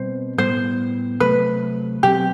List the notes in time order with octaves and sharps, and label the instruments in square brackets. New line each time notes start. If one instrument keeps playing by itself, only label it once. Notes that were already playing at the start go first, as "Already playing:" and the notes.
Already playing: [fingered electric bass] B2 G3 C4 [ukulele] C5
[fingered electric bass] A2 G3 B3 [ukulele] C5
[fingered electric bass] C3 F#3 A3 [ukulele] B4
[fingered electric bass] B2 F#3 C4 [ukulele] G4